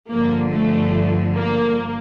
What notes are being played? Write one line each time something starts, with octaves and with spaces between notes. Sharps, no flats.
G1 G2 D3 F3 A#3
A3
A#3